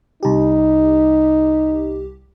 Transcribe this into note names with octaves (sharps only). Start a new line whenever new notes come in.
C2 D#4 G4